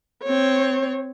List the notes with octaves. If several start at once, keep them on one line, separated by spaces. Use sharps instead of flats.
C4 C#5